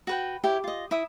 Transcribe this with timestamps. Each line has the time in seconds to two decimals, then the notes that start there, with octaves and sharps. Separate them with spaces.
0.07 F#4 B4 G5
0.44 E4 G4 C#5
0.64 F4 D#5
0.91 E4 E5 D#6